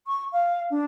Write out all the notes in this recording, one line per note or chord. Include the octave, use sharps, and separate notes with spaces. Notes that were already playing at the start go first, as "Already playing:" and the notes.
C#6
F5
D4